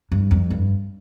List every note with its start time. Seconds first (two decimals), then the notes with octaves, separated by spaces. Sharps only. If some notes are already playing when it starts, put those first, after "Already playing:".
0.12 G2
0.31 F2
0.50 G2